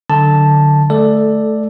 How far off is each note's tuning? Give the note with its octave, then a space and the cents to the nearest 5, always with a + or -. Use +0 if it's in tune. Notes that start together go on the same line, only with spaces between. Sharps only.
D3 +5 F#3 -15 A5 +0
A3 -20 A4 +0 D5 +5